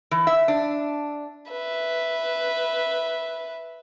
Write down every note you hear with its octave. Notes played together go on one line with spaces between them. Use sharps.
E3
E5
D4
B4 E5